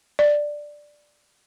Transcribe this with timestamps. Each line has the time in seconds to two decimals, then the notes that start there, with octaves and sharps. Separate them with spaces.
0.19 D5